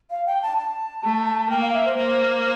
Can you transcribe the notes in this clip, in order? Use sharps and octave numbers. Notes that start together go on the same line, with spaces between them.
F5
G5
A5
A5
A3
A#3 G5
F5
E5
C5
A#3 C5